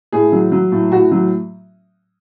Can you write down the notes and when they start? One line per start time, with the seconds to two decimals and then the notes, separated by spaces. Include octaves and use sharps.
0.12 A2 G#4
0.32 F#3
0.52 F#3
0.72 A2
0.92 A2 F#4
1.11 F#3